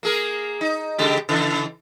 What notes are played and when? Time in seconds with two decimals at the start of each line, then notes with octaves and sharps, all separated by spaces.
0.03 A#3 G#4 A#4
0.61 D#4
0.98 C#3 G#3 G4
1.29 C#3 E3